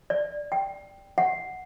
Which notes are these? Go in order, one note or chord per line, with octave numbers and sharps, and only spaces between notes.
D5
G5
F#5